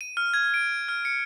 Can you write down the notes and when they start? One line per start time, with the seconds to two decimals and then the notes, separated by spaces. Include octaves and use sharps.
0.01 D#7
0.17 F6
0.34 G#6
0.54 D7
0.88 F6
1.05 C#7